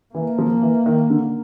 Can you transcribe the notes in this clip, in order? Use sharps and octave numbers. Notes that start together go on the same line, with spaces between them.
E3 A#3
F3
E3
D#3
D3